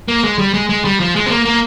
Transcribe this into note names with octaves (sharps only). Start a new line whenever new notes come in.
A#3
G#3
G3
G#3
G#3
G3
F3
G#3
C4
A#3
A#3